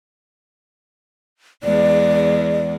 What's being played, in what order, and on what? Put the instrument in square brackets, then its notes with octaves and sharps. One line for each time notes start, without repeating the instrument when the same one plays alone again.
[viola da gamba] E2 G#3 [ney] D5